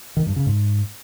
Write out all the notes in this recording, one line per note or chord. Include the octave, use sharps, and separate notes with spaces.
D#3
G2
C#3
G#2